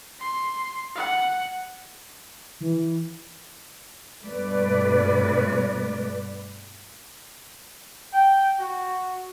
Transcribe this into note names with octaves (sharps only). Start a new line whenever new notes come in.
C6
F#5
E3
G2 B2 A3 B4 D5
G5
F#4